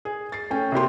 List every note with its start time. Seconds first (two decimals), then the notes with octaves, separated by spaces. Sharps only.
0.05 G#4
0.32 A6 C7
0.50 A3 C#4 G5
0.72 C3 A#3 G4 C6